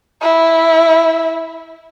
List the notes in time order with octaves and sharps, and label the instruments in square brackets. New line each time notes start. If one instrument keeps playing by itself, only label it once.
[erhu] E4